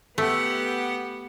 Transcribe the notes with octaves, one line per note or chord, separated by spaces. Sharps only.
A3 B3 G4 F#5